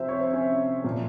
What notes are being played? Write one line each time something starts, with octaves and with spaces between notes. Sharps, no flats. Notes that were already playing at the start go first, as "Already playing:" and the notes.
Already playing: C3 F3 C5 E5
C#5
C5
C#4
A#2 F3